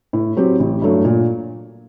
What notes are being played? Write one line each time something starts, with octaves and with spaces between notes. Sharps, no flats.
A2
F#3 C4 G4
A1
G2 F#3 A3
A#2